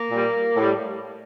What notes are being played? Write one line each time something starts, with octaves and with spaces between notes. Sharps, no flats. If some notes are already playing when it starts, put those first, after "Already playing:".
Already playing: A#3
A#2 G3
A2 G3